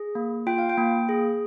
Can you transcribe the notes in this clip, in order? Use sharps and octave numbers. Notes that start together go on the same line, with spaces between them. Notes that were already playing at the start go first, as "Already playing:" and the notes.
Already playing: G#4
A#3
F4 G5
F5
G5
A#3
G#4